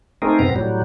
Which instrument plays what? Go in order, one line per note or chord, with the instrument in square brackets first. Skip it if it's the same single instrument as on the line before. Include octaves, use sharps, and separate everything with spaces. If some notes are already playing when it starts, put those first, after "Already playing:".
[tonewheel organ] A3 C4 D#4 G#4 A#4
F#2 C3 B3 C4 A#5
A2 F#3 G3